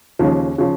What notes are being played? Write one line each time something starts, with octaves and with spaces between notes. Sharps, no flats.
D#2 C#3 F3
C#3 F3